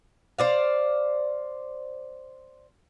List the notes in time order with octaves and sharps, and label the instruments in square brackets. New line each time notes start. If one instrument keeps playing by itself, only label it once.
[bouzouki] C5 D5 F5